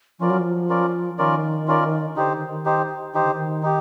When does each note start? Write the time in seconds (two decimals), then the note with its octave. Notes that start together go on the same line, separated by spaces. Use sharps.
0.20 F3 C#4 F4 A#4 D5
0.30 F#3
0.39 F3
0.69 C#4 F4 A#4 D5
1.18 D#3 C#4 F4 A#4 D5
1.68 C#4 F4 A#4 D5
2.16 D3 D#4 G4 C5
2.32 D#3
2.48 D#3
2.65 D#4 G4 C5
3.13 D#3 D#4 G4 C5
3.23 D3
3.33 D#3
3.63 D#4 G4